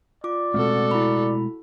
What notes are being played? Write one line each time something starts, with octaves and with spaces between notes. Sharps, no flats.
F4 D5 D6
B2 G#3 A3 C4 F#4 A4
E4 B5